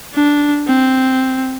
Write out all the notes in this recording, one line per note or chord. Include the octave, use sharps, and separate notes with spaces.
D4
C4